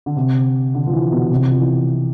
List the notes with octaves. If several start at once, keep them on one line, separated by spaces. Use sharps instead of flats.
D3
C3
D3
F3
E3
B2
C3
F3
E3